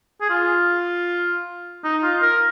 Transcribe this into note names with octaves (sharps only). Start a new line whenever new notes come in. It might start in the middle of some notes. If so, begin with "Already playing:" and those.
G#4
F4
D#4
F4
A#4